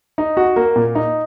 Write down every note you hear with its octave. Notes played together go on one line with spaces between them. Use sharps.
D#4
F#4
A#3
A#2
D#4